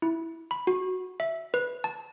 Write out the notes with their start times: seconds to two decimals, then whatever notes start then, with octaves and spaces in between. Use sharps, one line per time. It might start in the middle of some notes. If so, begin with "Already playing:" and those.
0.02 E4
0.51 B5
0.67 F#4
1.20 E5
1.54 B4
1.84 A5